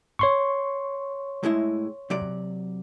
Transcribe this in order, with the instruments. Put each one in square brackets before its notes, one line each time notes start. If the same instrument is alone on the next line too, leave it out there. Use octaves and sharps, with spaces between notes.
[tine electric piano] C#5 C6 C#6
[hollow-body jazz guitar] A2 G#3 E4
C3 F#3 D5